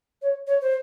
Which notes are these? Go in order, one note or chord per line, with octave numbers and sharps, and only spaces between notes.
C#5
C#5
C5